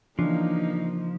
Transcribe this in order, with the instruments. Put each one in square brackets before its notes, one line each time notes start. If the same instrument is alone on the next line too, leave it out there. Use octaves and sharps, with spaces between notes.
[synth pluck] C#3 E3 D4 [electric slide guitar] F3 [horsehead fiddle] A#3 D#4